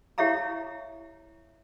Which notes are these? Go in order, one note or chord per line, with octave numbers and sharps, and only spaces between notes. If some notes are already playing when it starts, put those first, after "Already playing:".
E4 G4 C#5 E5 F5 A#5